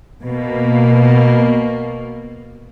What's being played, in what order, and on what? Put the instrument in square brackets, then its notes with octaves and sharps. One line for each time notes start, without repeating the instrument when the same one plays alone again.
[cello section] B2 A#3